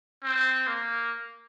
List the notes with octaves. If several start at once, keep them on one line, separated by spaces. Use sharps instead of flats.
C4
A#3